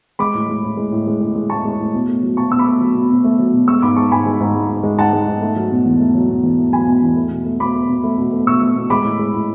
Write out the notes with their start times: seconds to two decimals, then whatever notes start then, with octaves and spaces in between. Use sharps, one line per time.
0.19 G#3 B5 D6
0.34 A2
0.49 G#3
0.63 A2
0.77 G#3
0.92 A2
1.07 G#3
1.21 A2
1.36 G#3
1.50 A2 A5 C#6
1.65 G#3
1.79 A2
1.94 B2
2.08 A3
2.22 F#3
2.37 B2 A5 C#6
2.51 B2 E6
2.59 B5 D6
2.67 A3
2.81 F#3
2.95 B2
3.10 B2
3.24 A3
3.39 F#3
3.54 B2
3.68 G#3 C#6 E6
3.82 G#2 B5 D6
3.96 G#3 A5 C#6
4.11 G#2 G#5 B5
4.26 G#3
4.40 G#2
4.54 G#3
4.69 G#2
4.83 G#3
4.98 G#2 F#5 A5
5.13 G#3
5.28 G#2
5.42 A3
5.56 F#3
5.71 B2
5.86 E2
6.00 A3
6.15 F#3
6.29 B2
6.43 E2
6.58 A3
6.72 F#3 G#5 B5
6.87 B2
7.02 E2
7.16 A3
7.31 B2
7.45 A3
7.60 B2 B5 D6
7.75 A3
7.89 B2
8.04 A3
8.18 B2
8.32 A3
8.46 B2 C#6 E6
8.62 A3
8.76 B2
8.90 G#3 B5 D6
9.05 A2
9.19 G#3
9.33 A2